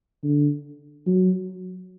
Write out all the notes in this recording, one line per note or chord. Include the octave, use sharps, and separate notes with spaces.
D3
F#3